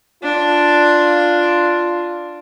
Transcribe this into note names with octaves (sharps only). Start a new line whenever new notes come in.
D4 F4